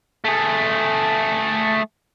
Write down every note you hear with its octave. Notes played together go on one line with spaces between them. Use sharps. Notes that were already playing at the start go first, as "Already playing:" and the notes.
A3 G#4